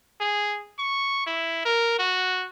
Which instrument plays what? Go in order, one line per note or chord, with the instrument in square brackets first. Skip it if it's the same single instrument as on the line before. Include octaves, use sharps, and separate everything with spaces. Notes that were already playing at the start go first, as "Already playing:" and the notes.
[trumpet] G#4
C#6
E4
A#4
F#4